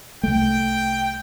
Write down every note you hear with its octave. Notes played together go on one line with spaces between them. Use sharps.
C2 A3 G5